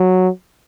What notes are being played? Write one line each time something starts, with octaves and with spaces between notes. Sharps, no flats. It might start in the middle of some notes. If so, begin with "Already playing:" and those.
Already playing: F#3